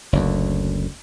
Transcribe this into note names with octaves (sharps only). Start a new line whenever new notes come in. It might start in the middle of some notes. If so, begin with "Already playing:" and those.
F#1 D2